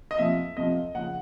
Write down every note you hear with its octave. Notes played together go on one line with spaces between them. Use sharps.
D#5
F2 C3 F3 E5
F2 C3 F3 D#5
C#3 F3 F#5